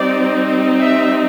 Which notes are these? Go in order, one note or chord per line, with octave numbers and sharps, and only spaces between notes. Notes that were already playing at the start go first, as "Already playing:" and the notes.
Already playing: G3 C4 D#4 D5
E5